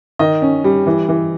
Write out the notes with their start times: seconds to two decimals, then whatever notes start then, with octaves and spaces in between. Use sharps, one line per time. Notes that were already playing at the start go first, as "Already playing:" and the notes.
0.19 D#3 D#5
0.42 C#4
0.64 G3
0.87 E3
1.09 E3